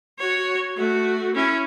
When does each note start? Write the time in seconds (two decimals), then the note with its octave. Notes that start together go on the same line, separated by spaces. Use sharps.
0.19 F#4 C#5
0.77 A3 F#4
1.35 C#4 E4